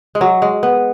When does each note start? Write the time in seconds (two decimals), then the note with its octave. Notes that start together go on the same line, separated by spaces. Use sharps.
0.15 G#3
0.21 F#3
0.42 G#3
0.63 B3